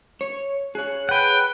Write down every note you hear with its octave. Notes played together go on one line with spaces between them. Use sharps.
C#5
G#4 C#5 F#6
B4 F#5 G5